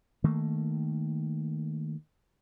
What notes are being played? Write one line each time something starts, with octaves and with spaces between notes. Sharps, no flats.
D#3 A3 A#3